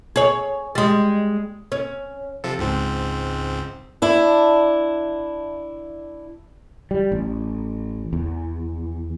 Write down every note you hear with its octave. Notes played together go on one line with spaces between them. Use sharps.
G#4 C#5
G3 G#3
C#4
C3 F3 A4
C#2 G#2 C4
D4 E4
G3
A1
E2